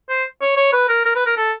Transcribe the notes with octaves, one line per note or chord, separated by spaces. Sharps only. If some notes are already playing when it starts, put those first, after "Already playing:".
C5
C#5
C#5
B4
A#4
A#4
B4
A#4
A4